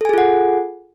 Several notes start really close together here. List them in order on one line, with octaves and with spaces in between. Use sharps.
A4 G#5 G#4 F4 F#5